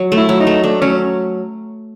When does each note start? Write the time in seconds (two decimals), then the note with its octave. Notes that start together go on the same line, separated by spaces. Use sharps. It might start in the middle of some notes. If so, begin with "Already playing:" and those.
Already playing: F#3
0.12 A3
0.17 E4
0.29 F#3
0.41 D#4
0.47 A3
0.63 A3 D4
0.81 F#3 C#4